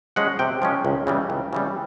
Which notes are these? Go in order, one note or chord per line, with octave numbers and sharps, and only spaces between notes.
F3 G#3 C#4 F#5
C3 G5
F3 G#3 C#4
C#2
C#3 E3 G3
C#2
C#3 E3 G3